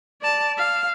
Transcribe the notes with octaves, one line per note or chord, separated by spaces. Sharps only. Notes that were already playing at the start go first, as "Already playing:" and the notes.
D5 A5
F5